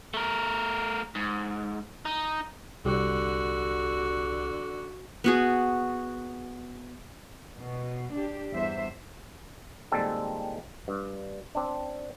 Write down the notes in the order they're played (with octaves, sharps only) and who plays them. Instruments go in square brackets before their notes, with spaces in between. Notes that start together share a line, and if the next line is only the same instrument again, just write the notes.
[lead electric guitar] A3 A#4
G#2
D#4
[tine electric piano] C2 G4 [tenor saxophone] D3 [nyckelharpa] F#4
[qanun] B3 F#4 G#4
[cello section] B2
D4 G4
E2 G2 C5 E5
[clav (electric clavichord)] A#2 D#3 G3 G#3 C4 A4
G2
C4 D4